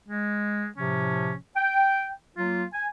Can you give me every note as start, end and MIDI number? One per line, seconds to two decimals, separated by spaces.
0.08 0.67 56
0.76 1.34 45
0.76 1.34 48
0.76 1.34 53
0.76 1.34 61
1.55 2.10 79
2.37 2.64 54
2.37 2.64 58
2.37 2.64 65
2.73 2.86 80